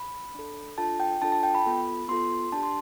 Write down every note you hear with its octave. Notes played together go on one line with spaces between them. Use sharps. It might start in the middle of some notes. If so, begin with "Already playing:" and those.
Already playing: B5
D4 A4
D4 F4 A4 A5
G5
D4 F4 A4 A5
A5
G5
B5
B3 F4 A4
B3 F4 A4 C6
D4 G4 A5
C6